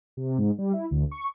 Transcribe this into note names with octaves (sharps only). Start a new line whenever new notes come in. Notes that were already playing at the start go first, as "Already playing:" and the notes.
C3
G#2
G3
E4
D2
C#6